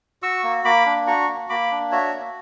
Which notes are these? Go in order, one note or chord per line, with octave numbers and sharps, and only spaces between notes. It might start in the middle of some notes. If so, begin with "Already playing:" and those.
F#4 C#6 E6
A#3
A#3 B5 D6
D4
F#4 A#5 C#6
A#3
A#3 B5 D6
D4
F#4 C#5 E5
A#3